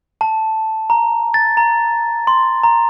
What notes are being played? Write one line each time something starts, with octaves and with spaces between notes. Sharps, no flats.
A5
A#5
A6
A#5
C6
A#5